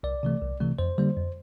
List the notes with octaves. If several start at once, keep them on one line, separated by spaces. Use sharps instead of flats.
C2 D5
C3 E3 A3
C2
C3 E3 A3
F2 C5
D3 G3 A#3
F2